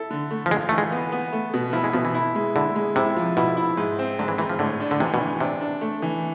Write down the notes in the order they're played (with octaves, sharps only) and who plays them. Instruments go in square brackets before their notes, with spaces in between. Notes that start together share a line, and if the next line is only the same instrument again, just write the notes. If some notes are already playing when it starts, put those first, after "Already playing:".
Already playing: [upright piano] E4 A4
D3
A3
[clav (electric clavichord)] F3
[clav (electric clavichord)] G#3 [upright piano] F4
[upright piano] E3 [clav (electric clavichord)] A3
[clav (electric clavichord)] G#3
[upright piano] B3
B3
A3
B2
[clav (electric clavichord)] F3 [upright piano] E4
[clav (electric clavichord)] G#3
[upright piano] B2 [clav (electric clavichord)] F3
[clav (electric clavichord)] E3
[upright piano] E4
G#3
[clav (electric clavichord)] D3 [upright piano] E4
[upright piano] G#3
[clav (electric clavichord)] C3 [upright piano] E4
[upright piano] F3
[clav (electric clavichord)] B2 [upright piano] E4
[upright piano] E4
G#2
C4
[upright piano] G#2 [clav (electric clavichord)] D3
[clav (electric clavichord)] E3
[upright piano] G#2 [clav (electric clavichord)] E3
[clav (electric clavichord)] F3
[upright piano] A2 [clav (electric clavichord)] D3
[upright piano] D4
[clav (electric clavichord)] D3
[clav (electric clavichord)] C3 [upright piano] E3
[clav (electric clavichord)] B2
[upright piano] E3
[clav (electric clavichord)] C3 [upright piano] D4
[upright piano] D4
A3
E3